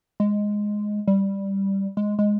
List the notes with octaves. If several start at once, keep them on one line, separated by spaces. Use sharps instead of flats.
G#3
G3
G#3
G#3